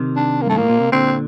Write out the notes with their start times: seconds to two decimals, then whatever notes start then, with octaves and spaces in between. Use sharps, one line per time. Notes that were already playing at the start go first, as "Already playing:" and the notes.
Already playing: C3 D#3
0.16 D4
0.42 A#3
0.46 G2 A3
0.57 A2 A#3
0.69 A#2
0.80 C3
0.92 A#2 D3 C4